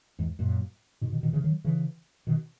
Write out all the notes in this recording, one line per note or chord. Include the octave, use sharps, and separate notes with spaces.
E2 G#2
F#2 A#2
G#2 B2
B2 D#3
B2 D#3
C#3 E3
D#3 F#3
C#3 E3
B2 D#3